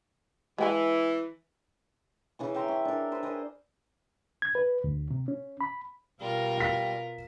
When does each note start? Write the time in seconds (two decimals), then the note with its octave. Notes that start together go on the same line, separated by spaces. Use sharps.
0.58 E3 G#3 G5 G#5
2.39 C#3 E3 C#6
2.54 E5 G5 A#5 C6
2.68 C#4
2.85 D4 A#4
3.11 B4 C5 B5
3.23 A#4 C5 D#5 G#5
4.42 G#6
4.55 B4
4.84 D2
5.11 C3
5.28 C#4
5.61 B5
6.21 B2 G3 F4 A#4
6.58 F5 B6